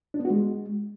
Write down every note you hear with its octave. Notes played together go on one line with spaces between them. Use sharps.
D4
B3
F#4
G#3